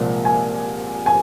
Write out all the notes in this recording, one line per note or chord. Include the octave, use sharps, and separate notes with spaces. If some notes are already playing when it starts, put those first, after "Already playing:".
Already playing: C2 A#2 F3 G#3
G#5
G#5